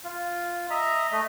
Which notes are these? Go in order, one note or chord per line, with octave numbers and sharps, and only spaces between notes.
F4
D#5 E5 A#5
A3 D#5